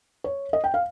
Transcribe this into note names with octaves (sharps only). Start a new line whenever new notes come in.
C#5
D#5
G5
F5